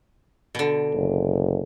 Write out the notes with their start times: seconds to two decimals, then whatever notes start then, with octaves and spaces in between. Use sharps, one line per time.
0.55 B2 D3
0.94 F#1